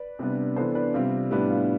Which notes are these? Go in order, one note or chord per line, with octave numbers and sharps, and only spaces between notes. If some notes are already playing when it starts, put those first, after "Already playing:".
Already playing: B4 D5
C3 G3 B3 D4
E3 B3 D4 A4 C5
B4 D5
C3 G3 C4 F4
A2 G3 B3 D4 E4 G4
F4